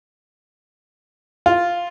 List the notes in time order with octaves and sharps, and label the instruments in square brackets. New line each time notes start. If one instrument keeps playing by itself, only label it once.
[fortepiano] F4